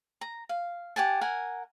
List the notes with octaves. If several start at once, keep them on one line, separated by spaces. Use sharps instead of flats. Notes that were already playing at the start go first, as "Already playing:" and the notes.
A#5
F5
G4 F#5 G#5 A5
A#4 F#5 G#5